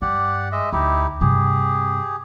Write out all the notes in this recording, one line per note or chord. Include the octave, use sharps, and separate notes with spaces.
G2 G4 D5 F#5
G#3 D#5 E5
D2 D#4 E4 G4
G2 C3 G4 G#4